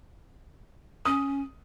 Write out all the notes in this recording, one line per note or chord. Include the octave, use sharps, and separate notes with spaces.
C#4 D#6